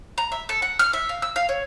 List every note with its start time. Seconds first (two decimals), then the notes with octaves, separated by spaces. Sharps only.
0.18 A#5
0.32 E5
0.49 A4
0.62 F#5
0.79 F6
0.93 E5
1.09 F5
1.22 E6
1.36 F5
1.49 C#5